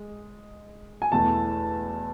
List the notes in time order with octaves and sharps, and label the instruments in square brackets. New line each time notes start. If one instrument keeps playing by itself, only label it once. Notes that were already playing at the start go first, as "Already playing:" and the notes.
Already playing: [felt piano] G#3
[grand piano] G#5
[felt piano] E2 B2 A3 E4 [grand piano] A5